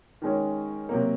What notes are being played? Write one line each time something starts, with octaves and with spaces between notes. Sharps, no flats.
D#3 G#3 C#4
C3 F#3 A#3